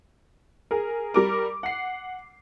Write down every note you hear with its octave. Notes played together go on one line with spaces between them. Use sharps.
G#4 A#4
G3 A#4 D6
F#5 C7